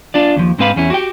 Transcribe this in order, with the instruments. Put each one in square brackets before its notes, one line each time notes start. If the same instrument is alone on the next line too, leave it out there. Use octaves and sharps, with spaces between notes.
[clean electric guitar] D4 F4 D5
D#2 F3
G#2 G#3 C4 B4 F5 B5
E2 C#4 E4
F#4 G4 G5